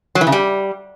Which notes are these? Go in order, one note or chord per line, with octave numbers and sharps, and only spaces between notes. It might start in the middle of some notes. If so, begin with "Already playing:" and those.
F#3
E3
C#3
G3